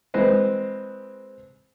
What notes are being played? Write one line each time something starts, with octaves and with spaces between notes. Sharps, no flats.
E3 G#3 C4 B4 C5 D#5